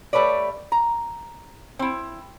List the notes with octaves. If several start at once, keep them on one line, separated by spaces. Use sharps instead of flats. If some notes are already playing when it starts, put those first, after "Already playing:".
G3 A3 B4 C#5 D5
A#5
C4 E4